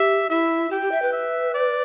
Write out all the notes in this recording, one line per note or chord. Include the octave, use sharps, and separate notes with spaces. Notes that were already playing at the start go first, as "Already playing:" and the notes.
Already playing: G4 E5
E4 E5
G4 G5
G4
E5
B4
E5
D5